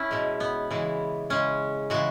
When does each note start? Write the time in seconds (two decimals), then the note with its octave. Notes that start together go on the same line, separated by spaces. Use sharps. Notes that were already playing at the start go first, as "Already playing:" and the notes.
Already playing: C#4 E4
0.11 B2 G#3
0.40 B3
0.71 C#3 E3 G#3
1.30 C#3 G#3 C#4
1.90 C#3 E3 G#3 F#4